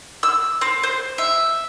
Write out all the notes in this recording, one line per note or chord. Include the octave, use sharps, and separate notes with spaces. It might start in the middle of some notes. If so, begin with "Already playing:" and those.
E6
C4
C5
E5